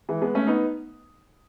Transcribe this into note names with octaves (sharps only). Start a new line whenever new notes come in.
E3 G#3
G#3 B3
A3 C#4
B3 D#4